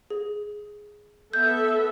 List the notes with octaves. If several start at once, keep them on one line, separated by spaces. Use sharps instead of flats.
G#4
B3 A4 E5 G6